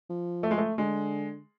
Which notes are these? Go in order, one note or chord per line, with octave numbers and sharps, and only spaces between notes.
F3
A3
G#3
A3
D3 G#3